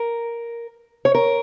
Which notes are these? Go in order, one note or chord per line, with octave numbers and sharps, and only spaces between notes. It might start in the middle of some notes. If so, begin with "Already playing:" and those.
Already playing: A#4
C#5
A#4